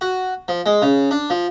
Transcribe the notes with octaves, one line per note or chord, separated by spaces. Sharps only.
F#4
F3
G#3
C#3
D4
F3